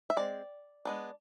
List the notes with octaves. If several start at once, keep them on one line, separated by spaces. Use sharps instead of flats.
E5
G#3 C4 D5
G#3 B3 D4